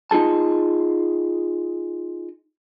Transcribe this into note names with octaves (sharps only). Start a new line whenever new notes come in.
D#4 F4 G#4 A5